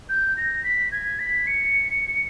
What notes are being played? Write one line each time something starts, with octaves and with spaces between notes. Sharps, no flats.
G6
A#6
B6
G#6
B6
C#7